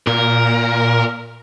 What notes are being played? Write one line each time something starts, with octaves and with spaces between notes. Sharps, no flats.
A#2 A#4